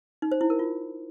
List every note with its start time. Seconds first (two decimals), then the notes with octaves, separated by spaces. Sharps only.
0.22 D#4
0.32 C5
0.41 E4
0.50 A#4
0.59 F4